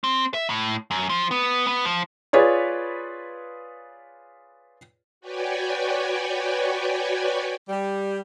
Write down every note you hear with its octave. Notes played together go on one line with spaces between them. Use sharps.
C4
E5
A2
F#2
F3
B3
B3
F3
F4 G#4 B4 C#5 D5
F#4 B4 C#5 D5 G5 G#5
G3